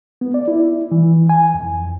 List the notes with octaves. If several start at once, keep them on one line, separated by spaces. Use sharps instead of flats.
B3
D5
E4
E3
G#5
F2